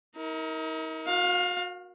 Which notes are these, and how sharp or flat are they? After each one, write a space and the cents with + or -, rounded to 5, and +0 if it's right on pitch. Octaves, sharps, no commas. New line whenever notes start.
D#4 +45 A#4 +0
F#4 -35 F5 +20